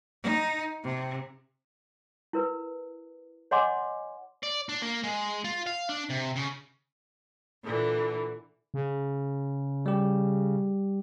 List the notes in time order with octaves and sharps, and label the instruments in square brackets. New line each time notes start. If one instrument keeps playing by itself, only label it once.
[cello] D#4
C3
[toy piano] E4 A#4 B4
C#5 D#5 F#5 G#5 C6 D6
[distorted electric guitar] D5
D4
A#3
G#3
F4
F5
D4
C3
C#3
[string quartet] A#2 D3 E3
[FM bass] C#3
[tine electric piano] G3 G4